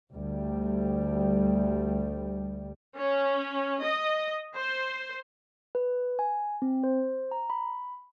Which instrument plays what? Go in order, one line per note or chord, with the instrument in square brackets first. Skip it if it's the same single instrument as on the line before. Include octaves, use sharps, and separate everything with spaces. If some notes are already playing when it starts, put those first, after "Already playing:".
[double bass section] D2 G3
[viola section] C#4
D#5
C5
[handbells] B4
G#5
C4
C5
A#5
B5